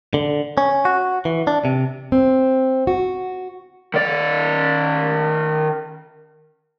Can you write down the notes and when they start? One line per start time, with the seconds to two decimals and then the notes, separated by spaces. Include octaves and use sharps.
0.14 D3
0.58 C#4
0.85 F#4
1.25 E3
1.47 D4
1.65 C3
2.12 C4
2.87 F#4
3.94 D#3 D5